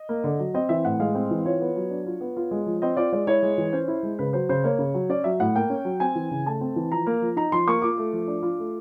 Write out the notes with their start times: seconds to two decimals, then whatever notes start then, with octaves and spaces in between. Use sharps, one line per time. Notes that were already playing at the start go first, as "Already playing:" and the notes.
Already playing: D#5
0.09 A#3
0.24 D3
0.40 F#3
0.54 C4 D#5
0.69 E3 E5
0.85 A2 F#5
1.00 G#3 F5
1.15 C4
1.31 E3
1.45 F4 C#5
1.61 B3
1.76 F#3
1.90 D4
2.06 F4
2.21 B3
2.37 F4
2.51 G#3
2.66 F3
2.82 C4 D#5
2.97 F4 D5
3.12 G#3 D5
3.27 E4 C#5
3.43 G#3
3.58 E3
3.73 C#4 C5
3.88 E4
4.03 G#3
4.19 C#3 B4
4.33 F#3 C5
4.49 C#3 C5
4.64 A#3 C#5
4.79 C#3
4.94 F#3
5.09 C#4 D5
5.24 F#3 E5
5.40 A2 F#5
5.56 A#3 G5
5.70 C#4
5.85 F#3
6.00 C4 G#5
6.15 E3
6.31 C#3
6.46 A3 A5
6.61 C4
6.76 E3
6.92 F3 A#5
7.07 A#3
7.22 F3
7.36 D#4 A#5
7.52 F3 C6
7.67 A#3 C#6
7.82 F4 D6
7.97 A3
8.13 F3
8.28 D4
8.43 F4
8.58 A3